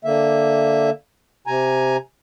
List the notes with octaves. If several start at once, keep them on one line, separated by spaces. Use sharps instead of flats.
D3 A#3 E5
C3 G#5 A#5